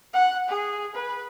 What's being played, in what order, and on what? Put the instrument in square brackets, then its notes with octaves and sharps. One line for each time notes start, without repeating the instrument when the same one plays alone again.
[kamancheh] F#5
G#4
B4